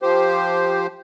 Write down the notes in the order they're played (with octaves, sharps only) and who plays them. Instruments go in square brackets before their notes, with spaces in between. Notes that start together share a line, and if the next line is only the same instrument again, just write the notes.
[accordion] F3 G4 C5